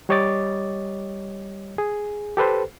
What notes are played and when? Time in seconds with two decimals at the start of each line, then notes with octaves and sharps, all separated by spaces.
0.09 G3 G4 C#5 D#5 D6 A6
1.78 G#4
2.37 G4 A4 B4 C5